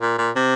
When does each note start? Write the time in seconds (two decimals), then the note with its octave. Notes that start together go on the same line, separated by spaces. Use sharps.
0.02 A#2
0.18 A#2
0.36 C3